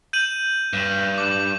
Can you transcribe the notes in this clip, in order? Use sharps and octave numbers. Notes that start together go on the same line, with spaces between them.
G6 D#7 F#7
G2
D6